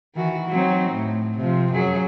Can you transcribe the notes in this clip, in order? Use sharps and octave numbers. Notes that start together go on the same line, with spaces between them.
D#3 E3 F#4
F#3 C4 D#4
A2
C3 F3
F#2 F#3 G#4